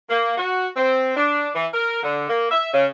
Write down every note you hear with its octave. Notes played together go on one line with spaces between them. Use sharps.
A#3
F#4
C4
D4
E3
A#4
D3
A#3
E5
C#3